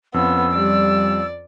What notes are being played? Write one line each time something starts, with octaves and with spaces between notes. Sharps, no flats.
F2 B3 C#4 F4 E6
G3 D5